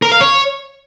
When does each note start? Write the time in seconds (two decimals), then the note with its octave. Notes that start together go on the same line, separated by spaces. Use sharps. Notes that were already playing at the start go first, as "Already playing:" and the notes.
0.02 A#4
0.12 F5
0.21 C#5